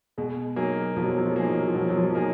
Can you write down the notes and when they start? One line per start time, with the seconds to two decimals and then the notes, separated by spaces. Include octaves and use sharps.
0.18 B2 G#3
0.56 F#3 A#3 D#4 G#4
0.97 B2 F3
1.03 F#3
1.11 F3
1.18 F#3
1.25 F3
1.32 F#3
1.36 F3 A#3 D#4 G#4
1.46 F#3
1.53 F3
1.61 F#3
1.68 F3
1.75 B2 F#3
1.82 F3
1.90 F#3
1.97 F3
2.03 F#3
2.10 F3
2.15 F#3 A#3 D#4 G#4